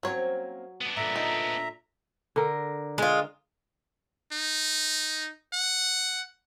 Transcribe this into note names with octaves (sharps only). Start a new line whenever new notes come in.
F#3 A#3 C4 C#4 C#5
B3 D4
A#2 D3 E5 A#5
D#4
D3 A#4
G#3 F4
D#4
F#5